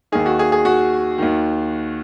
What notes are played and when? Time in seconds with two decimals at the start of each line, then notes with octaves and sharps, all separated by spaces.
0.12 D#2 D#3 G#4
0.26 F#4
0.39 G#4
0.52 G#4
0.65 F#4
1.18 D#2 D#3